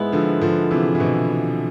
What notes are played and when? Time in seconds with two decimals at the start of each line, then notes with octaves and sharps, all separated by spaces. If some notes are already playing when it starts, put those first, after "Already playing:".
Already playing: G#2 G#3 B3 E4
0.12 D3 F3
0.41 D3 F3
0.71 C3 E3
0.95 E3
1.00 B2 D3